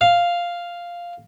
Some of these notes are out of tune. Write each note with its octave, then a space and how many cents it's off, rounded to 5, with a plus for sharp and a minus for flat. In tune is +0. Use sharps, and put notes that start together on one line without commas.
F5 +0